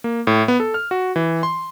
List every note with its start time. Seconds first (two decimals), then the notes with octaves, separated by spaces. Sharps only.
0.04 A#3
0.27 A2
0.48 B3
0.60 A4
0.74 F6
0.91 F#4
1.16 E3
1.43 C6